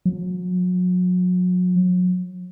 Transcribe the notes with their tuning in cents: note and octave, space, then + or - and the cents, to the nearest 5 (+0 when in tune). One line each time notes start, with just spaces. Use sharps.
F#3 -35